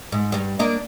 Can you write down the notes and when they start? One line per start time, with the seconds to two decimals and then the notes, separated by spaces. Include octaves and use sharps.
0.12 G#2
0.32 G2 G3
0.59 A#3 D4 D#5